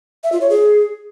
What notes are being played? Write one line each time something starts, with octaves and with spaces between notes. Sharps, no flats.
E5
F4
C#5
G#4